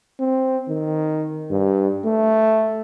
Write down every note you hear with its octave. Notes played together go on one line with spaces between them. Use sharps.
C4
D#3
G2
A3